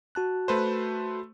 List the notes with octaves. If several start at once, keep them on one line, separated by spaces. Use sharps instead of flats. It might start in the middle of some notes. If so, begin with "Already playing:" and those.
F#4 A5 F#6
A3 B4 C5